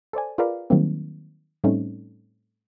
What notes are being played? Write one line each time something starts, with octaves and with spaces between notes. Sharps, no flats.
A4 C5 D5 G#5
F4 G#4 A#4 B4 D5 F5
D#3 F#3 G3 A#3 C4
A2 G3 A3 C4 C#4 D#4